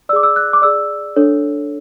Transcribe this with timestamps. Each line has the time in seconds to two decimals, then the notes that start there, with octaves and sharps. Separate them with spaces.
0.09 D5 E6
0.13 G#4 D6
0.23 E6
0.36 F#6
0.53 D6
0.62 G#4 D5 E6
1.16 D4 A4 C#5